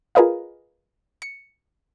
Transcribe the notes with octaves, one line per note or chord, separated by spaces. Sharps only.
F4 G#4 A#4 B4 D#5 F5
C#7